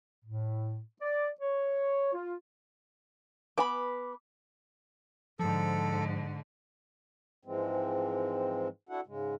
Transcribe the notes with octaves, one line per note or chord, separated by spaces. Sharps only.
A2
D5
C#5
F4
B3 B4 G#5 B5 D6
G#2 D3 F3 A4
G#2 E3 F3 G#3 C4
D4 E4 F#4 A4 F#5
G#2 C#3 G#3